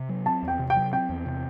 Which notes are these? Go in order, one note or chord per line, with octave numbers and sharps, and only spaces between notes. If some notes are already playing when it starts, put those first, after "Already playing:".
Already playing: C3
F#3
C4 A5
E2
G5
C3
G5
F#3
C4 G5
E2
C3